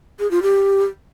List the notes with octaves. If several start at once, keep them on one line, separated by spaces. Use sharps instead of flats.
G#4
F4
G4